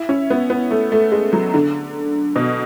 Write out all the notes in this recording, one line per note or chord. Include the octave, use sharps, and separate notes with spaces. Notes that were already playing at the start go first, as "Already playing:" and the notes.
Already playing: E4
C#4
B3
B3
A3
A3
G#3
F#3
D3
B2